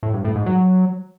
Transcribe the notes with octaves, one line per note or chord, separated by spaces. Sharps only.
A2
G2
A2
G#2
F#3